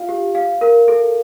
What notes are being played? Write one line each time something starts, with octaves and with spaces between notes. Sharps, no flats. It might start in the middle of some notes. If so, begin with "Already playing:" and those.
Already playing: F4 F5
G4
F5
A#4
A4